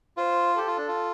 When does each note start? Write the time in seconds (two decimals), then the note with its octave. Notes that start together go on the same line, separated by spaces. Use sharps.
0.17 F4 C5
0.58 G4 A4
0.67 F4
0.78 D4
0.88 F4